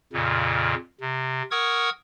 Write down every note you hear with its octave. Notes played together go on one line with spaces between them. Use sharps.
F2 A#2 C#3
C3
A#4 F#5 C#6 D#6 E6 G#6